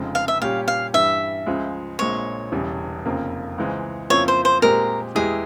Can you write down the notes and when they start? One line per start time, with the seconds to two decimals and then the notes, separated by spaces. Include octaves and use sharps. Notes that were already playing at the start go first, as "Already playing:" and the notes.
Already playing: F1 F2 C#3 F3 G#3
0.15 F5
0.28 E5
0.41 A#2 G3 C#4 G4 F5
0.68 F5
0.94 G2 E3 G3 E5
1.46 C#2 C#3 F3 G#3
1.99 A#1 A#2 G#3 C4 C#5
2.52 E1 E2 C#3 E3 G3
3.05 F1 F2 C#3 F3 A#3
3.58 C#2 C#3 E3 G#3 C4
4.10 F2 C#3 F3 A#3 E4 C#5
4.28 C5
4.45 C5
4.62 A#2 G#3 C4 G4 A#4
5.15 E2 E3 G#3 E4 G4 G#4